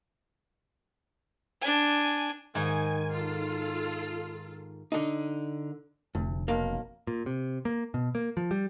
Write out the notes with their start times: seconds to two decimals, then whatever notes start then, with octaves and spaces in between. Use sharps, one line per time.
1.62 D4 G#5
2.55 G#2 D#3 G#5
3.12 F4 A4
4.92 D3 D#4
6.15 F1 D2
6.48 B1 A#3
7.07 A#2
7.26 C3
7.65 A#3
7.94 B2
8.15 A#3
8.37 F3
8.51 G3